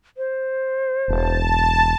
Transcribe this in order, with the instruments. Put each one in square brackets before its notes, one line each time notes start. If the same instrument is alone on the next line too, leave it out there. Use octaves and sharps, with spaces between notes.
[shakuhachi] C5
[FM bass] E1 [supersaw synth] A5